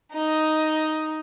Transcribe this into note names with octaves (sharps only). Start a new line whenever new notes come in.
D#4 D#5